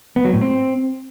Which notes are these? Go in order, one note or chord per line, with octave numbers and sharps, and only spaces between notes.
B3
F#3
A2
C4